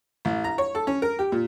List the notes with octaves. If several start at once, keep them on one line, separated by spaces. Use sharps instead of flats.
A1
A#5
C#5
A4
C#4
A#4
G4
A#2